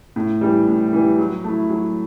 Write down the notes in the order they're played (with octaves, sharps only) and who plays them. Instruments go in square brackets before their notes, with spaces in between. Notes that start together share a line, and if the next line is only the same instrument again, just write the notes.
[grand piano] A2
E3 G3
A2
E3 G3
F#3
A3 E4
F#3